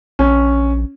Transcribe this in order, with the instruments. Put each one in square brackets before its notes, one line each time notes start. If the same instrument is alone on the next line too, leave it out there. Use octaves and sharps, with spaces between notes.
[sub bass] A#1 [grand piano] C#4